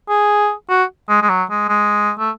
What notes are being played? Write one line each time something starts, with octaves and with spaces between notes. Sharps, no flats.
G#4
F#4
G#3
G#3
F#3
G#3
G#3
A3